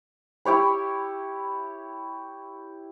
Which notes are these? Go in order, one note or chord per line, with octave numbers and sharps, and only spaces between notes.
E4 G4 C#5 B5